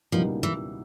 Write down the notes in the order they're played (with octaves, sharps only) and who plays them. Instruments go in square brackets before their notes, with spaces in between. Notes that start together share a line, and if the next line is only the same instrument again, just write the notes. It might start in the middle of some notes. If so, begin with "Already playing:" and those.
[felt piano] C#2 B2 G3 A#3 D#4 [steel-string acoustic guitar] F3
[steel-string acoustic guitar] E3